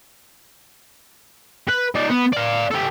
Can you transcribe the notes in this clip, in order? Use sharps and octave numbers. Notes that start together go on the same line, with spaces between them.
B4
D#4 D5
B3
D5 F5
G4 A4